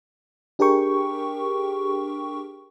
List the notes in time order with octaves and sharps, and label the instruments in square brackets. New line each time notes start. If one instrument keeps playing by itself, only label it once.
[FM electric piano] D4 G4 G#4 A#4 G5 C#6